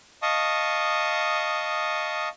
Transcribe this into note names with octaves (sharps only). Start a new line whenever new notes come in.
D#5 F5 A5 C#6 D#6